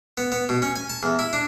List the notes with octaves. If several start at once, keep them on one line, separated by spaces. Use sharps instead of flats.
B3
B3
B2
C#4
G#5
A5
E2
E4
D4